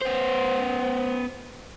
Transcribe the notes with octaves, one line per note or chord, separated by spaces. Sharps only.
B3 C5